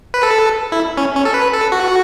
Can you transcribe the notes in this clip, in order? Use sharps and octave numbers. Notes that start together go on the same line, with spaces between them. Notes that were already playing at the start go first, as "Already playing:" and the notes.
B4
A4
E4
C#4
C#4
A4
B4
A4
F#4